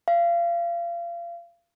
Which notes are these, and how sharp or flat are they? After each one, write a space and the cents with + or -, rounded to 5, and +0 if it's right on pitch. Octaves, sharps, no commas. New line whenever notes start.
F5 -30